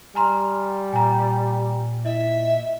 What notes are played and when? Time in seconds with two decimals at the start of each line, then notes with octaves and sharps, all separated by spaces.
0.15 G3 G#5 A#5 C6 F6
0.93 A#2 G#5 A#5
2.05 E4 D#5 E5